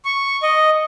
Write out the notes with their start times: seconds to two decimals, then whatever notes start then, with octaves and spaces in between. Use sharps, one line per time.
0.05 C#6
0.43 D#5